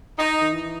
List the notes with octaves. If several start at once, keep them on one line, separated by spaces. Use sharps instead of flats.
D#4
D#3
E3